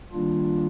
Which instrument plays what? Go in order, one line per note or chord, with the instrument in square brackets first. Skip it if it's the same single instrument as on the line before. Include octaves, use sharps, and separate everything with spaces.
[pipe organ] D#3 G3 A#3 D4 F4